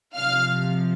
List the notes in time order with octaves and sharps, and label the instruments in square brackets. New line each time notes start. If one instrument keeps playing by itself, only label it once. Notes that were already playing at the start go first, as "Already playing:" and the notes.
[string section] C3 F3 F5 F6